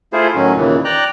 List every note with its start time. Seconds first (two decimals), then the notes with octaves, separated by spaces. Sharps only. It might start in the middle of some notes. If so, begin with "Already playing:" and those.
0.13 A3 E4 F4 G#4 C5
0.35 A2 D#3 F#3 C#4
0.56 D#2 A#2 C#3 E3
0.85 D5 G5 A#5 F#6